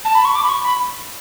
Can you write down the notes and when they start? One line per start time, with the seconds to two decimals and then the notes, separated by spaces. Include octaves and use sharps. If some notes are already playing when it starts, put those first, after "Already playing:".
0.05 A5
0.15 B5
0.25 C#6
0.35 D6
0.44 B5
0.49 C#6
0.64 B5